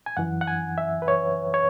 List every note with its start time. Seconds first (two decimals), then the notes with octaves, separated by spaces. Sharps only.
0.06 G#5
0.17 F#2 E3 F#5
0.41 F#5
0.47 G#5
0.78 E5
1.02 B4
1.08 C#5
1.54 C#5